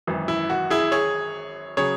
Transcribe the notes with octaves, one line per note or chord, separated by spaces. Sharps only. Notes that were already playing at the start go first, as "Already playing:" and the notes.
G#1 F#2 E3
E4
F#4
E4 G#4
G#4 C#5
C#3 F#3 G#4 C#5